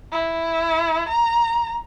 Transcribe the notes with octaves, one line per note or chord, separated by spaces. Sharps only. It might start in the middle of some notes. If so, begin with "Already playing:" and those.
E4
A#5